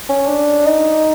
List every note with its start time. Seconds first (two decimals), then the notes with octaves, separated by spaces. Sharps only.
0.09 C#4
0.28 D4
0.66 D#4